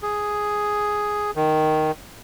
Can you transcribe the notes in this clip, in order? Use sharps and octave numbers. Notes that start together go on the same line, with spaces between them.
G#4
D#3